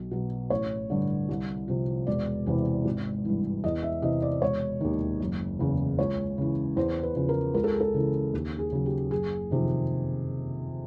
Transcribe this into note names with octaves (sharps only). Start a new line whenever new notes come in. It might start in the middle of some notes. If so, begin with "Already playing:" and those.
Already playing: B1
B2 F#3
A1 C#5
G2 D3
C2
C3 F3
E1 D5
E2 C3 E3
G#1
G2 E3
E2 D#5
E5
C3 E3 D#5
D5
E1 C#5
D#2 D#3
F#1
E2 C#3 E3
C#2 C#5
C#3 E3
E2 C5
B4
C#3 F3
A#4
C#2 A#4
A4
G#4
A4
C#3 E3
D#2
G#4
C#3 F#3
G4
F#1 G#4
F2 C3 D#3